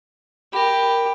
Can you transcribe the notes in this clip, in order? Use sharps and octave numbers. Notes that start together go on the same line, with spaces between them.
G4 A#4 B5